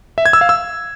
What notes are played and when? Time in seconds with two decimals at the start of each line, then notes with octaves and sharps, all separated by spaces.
0.18 E5
0.26 G#6
0.33 E6
0.41 F5
0.49 E6